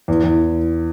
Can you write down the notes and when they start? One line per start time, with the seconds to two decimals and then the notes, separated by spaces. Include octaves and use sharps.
0.08 E2
0.24 E2